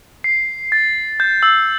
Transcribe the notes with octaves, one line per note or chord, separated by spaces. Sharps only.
C7
A6
G6
E6